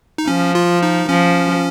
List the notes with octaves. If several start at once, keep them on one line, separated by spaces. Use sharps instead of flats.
D#4
F3 C#4
F4
D#4
F3 C#4